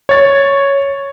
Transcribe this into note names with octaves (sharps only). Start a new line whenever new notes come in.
C#5 A6